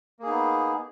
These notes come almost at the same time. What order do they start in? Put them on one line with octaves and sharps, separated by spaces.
A#3 G#4 D#4 B3